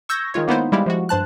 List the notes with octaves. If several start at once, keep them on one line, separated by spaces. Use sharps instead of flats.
C#6 E6 G6 G#6 A#6
D#3 G#3 F4 C#5
A#3 B3 D#4 E4 C5
G3 G#3 E4 G4 F5
F3 G#3 F#4
G2 C5 A5 F#6